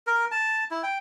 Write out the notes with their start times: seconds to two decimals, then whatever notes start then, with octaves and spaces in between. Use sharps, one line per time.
0.07 A#4
0.31 A5
0.71 E4
0.83 G5